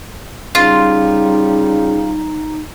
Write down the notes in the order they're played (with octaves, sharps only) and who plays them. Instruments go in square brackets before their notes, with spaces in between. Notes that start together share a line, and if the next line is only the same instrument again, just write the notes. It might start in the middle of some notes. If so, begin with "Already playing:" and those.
[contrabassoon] C#3 [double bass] G3 [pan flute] D#4 [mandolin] F4